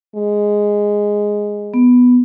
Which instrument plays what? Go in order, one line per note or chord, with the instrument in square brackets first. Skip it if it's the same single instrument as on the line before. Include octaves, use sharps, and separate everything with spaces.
[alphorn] G#3
[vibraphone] B3